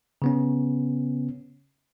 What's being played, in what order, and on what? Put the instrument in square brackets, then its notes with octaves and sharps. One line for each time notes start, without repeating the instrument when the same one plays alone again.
[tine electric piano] C#3 B3 C#4